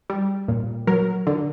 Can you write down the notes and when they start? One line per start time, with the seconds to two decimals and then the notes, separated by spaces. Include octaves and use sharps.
0.10 G3
0.48 A#2
0.87 F#3 A#4
1.27 D3